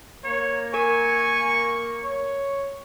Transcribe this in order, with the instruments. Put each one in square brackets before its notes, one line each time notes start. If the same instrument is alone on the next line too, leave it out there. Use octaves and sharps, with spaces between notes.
[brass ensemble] A#3 [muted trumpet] C#5
[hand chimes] A#4 [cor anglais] G#5 [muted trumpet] C#6
[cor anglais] C#5